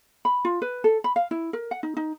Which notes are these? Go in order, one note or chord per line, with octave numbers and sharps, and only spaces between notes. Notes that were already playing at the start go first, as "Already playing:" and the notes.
B5
F4
B4
A4
B5
F5
E4
A#4
F#5
D#4
D#4